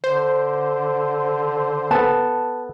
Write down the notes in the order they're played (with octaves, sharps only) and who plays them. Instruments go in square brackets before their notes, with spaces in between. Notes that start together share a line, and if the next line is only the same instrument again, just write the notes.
[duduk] D3 [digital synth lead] C5
[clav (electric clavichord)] B3 A4 [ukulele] A5